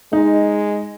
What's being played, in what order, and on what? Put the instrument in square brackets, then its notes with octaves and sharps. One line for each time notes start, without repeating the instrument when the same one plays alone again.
[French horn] G#3 [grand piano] D#4